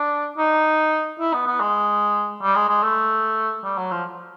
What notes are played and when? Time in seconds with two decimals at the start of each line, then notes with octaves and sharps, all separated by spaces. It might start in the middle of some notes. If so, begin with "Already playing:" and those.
Already playing: D4
0.38 D#4
1.19 E4
1.33 B3
1.46 B3
1.60 G#3
2.42 G3
2.55 G#3
2.69 G#3
2.83 A3
3.64 G3
3.78 F#3
3.91 F3